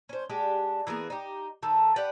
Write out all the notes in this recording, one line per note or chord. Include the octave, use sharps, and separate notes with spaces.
C#4 C5
G#3 D4 G4
E3 A#3 B3 G#4
D#4 G4
D#3 A3 A4
G4 B4 D5 F#5